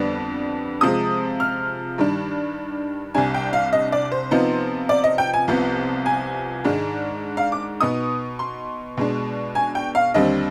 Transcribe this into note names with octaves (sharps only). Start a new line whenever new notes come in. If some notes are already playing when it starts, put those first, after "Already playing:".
Already playing: F2 D3 G3 B3 D4
C3 F3 G#3 D#6
F6
G2 D#3 G3 D4
C2 C3 G3 D4 G#5
G5
F5
D#5
D5
C5
C3 F3 B3 D#4
D5
D#5
G5
G#5
C2 C3 F3 B3
G#5
G#2 D#3 G#3 D4
F5
D6
B2 B3 D#4 D#6
C6
B2 G#3 D4
G#5
G5
F5
D#2 D3 G3 C4 D#5